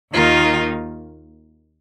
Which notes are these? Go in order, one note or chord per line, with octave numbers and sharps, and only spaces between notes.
D#2 D#3 A#3 D#4 F4